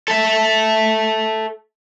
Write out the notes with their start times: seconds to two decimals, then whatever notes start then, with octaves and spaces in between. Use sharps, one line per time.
0.08 A4 E5